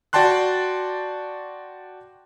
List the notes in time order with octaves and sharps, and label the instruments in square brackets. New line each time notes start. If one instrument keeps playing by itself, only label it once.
[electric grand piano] F#4 D5 G5 A5 C6 F#6